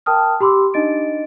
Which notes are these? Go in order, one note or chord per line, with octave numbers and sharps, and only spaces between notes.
A#4 G5 A5 D#6 F6
G4 B5 C6 D6 E6
D4 D#4 D#5 A6 D7